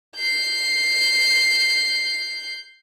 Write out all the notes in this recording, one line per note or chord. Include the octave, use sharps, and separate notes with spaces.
G6 C7